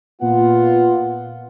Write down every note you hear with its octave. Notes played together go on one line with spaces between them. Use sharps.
A#2 B3 F4 F#5